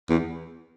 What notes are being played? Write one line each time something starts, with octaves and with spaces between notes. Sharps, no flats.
E2